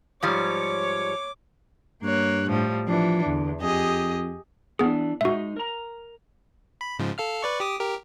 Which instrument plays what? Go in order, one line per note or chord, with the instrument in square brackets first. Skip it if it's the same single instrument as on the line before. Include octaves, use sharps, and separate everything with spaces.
[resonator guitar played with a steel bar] G#2 F3 G3 [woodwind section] C#5 [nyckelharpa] D6
[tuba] G2 [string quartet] A#3 C#5 F#6
[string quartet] A2 F3 G3
[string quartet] E3 D4 [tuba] F3
[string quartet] E2 [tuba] D3
[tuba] F2 [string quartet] G4 G#4 D#5
[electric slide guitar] E3 D4 [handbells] B3 G#4
[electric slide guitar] G#3 D#4 [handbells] F#4 E5
[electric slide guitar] A#4 A#5
[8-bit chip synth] B5
G#2 C#3 F3
A4 F5 F6
B4 D5 C#6
G4 D6 D#6
G4 A#4